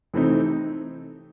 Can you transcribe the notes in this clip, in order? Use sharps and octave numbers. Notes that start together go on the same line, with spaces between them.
C3 E3 A3 C4 D#4